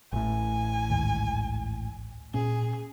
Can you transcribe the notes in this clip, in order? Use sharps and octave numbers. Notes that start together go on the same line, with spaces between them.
A1 A2 G#5
D2 G#2 D#3
A#2 C#4 G#4